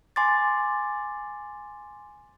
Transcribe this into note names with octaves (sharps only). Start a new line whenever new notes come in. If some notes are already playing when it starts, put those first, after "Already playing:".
G#5 C6 D6 A6